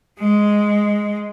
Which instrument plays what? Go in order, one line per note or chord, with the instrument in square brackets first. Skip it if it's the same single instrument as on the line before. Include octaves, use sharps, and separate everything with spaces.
[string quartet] G#3